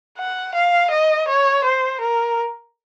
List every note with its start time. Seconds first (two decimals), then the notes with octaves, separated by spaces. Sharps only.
0.18 F#5
0.55 F5
0.91 D#5
1.28 C#5
1.65 C5
2.01 A#4